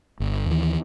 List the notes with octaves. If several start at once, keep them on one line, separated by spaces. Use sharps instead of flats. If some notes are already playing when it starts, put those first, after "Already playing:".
G1
D#2 E3